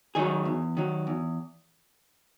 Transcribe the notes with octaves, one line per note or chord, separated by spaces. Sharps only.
D#3 F#3 G#4
E2
D#3 F#3
E2